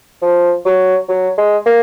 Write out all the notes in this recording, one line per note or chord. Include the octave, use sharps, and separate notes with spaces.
F3
F#3
F#3
G#3
A#3